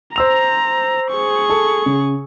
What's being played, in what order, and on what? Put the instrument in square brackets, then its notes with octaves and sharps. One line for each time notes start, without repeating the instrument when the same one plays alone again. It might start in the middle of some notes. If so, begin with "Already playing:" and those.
[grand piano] C5 E6 F7 [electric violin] A#5
[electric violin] G#4 C#6
[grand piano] A4
C#3